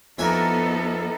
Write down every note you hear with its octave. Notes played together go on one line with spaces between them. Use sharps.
F2 E3 B3 D#4 A4 A#4 E5 G#5